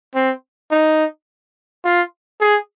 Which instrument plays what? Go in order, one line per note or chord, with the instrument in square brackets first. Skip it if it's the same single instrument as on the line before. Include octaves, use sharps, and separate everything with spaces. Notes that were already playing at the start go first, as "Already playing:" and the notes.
[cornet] C4
D#4
F4
G#4